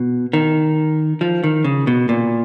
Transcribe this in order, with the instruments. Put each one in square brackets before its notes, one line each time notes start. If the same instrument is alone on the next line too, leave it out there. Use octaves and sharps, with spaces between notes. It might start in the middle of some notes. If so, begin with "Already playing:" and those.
Already playing: [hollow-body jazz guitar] B2
D#3
F3
D#3
C#3
B2
A#2